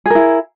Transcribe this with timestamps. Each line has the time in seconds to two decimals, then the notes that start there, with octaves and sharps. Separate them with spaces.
0.06 G#4
0.10 A#4
0.15 E4